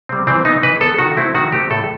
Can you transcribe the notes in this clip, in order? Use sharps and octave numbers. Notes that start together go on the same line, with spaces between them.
G3 C4
E3 C4
B3 D#4
E3 B4
B3 A4
D#3 F#4
A3 C4 E4
D#3 F#4
A3 C4 G4
A2 A4